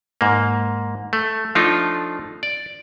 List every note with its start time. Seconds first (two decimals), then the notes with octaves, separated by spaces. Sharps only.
0.21 G#2 A#3
1.13 A3
1.55 F3 A3 D4 D#4 F4
2.43 D5